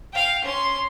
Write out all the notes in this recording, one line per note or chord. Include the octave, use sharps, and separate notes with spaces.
F5 G5
C#4 C6